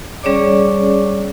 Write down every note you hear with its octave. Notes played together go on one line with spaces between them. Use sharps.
G3 C#4 G#4 C#5 D5 D6